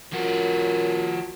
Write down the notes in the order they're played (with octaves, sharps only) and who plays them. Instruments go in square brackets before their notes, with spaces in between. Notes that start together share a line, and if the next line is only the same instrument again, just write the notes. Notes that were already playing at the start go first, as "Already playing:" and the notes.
[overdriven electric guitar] F3 F#4 [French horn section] C#4 F4 A#4